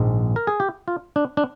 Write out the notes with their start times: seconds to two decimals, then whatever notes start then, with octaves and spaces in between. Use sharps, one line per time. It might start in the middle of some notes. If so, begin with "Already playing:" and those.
Already playing: A#1 G#2 D#3 G#3 C4
0.36 A#4
0.47 G#4
0.60 G4
0.88 F4
1.16 D4
1.37 D4